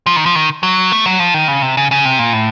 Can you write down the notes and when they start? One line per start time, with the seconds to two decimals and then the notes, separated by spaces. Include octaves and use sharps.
0.06 F3
0.16 D#3
0.26 F3
0.35 D#3
0.63 F#3
0.92 A3
1.06 F#3
1.19 F3
1.34 D#3
1.48 C#3
1.62 C3
1.77 C#3
1.91 C#3
2.05 C3
2.19 A#2
2.33 A2